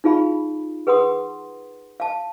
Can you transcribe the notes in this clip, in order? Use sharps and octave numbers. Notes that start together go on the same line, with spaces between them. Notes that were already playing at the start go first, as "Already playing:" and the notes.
D#4 F4 G#4 F5 B5
G#4 B4 F#5 C6 D#6
F5 A5